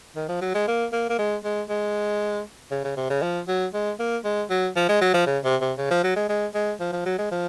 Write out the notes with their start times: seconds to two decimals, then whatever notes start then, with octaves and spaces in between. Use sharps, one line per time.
0.16 D#3
0.28 F3
0.41 F#3
0.54 G#3
0.67 A#3
0.92 A#3
1.09 A#3
1.18 G#3
1.44 G#3
1.69 G#3
2.71 C#3
2.84 C#3
2.97 C3
3.10 C#3
3.22 F3
3.48 F#3
3.74 G#3
3.99 A#3
4.24 G#3
4.50 F#3
4.76 F3
4.89 G#3
5.01 F#3
5.14 F3
5.27 C#3
5.44 C3
5.61 C3
5.78 C#3
5.91 F3
6.03 F#3
6.16 G#3
6.29 G#3
6.54 G#3
6.80 F3
6.93 F3
7.06 F#3
7.18 G#3
7.31 F3